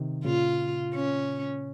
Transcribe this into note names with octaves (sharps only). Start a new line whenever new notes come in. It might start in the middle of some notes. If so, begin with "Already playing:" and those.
Already playing: C3 D#3
A#2 C#3 F4
C#4